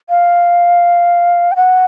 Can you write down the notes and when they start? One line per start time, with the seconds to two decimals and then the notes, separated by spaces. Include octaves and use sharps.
0.09 F5
1.52 G5
1.56 F#5